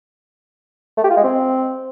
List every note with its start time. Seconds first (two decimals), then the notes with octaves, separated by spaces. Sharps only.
0.97 A3
1.04 G4
1.10 F4
1.17 G#3
1.24 C4